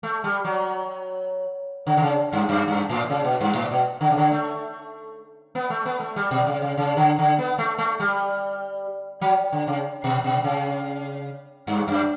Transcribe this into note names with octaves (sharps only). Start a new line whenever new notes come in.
A3
G3
F#3
D3
D3
C#3
G2
F#2
G2
A2
C#3
B2
G2
A2
B2
D3
C#3
D3
A3
B3
A3
B3
A3
G3
B2
C#3
C#3
C#3
D3
D3
B3
A3
A3
G3
F#3
D3
C#3
B2
B2
C#3
G2
F#2